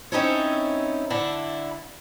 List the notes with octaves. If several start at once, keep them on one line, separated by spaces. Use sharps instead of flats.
C4 C#4 D#4 E4 A4 C#5
D3 D4 E4